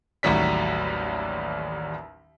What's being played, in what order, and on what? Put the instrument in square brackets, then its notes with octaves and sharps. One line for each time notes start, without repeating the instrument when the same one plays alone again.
[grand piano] A1 D#2 A2 F#3 G3 B6